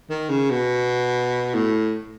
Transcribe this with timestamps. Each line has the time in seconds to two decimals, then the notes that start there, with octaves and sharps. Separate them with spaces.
0.09 D#3
0.29 C#3
0.51 B2
1.54 A2